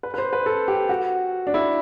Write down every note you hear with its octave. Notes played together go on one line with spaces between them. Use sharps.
B4
B4
C5
B4
A4
G4
F#4
D4
E4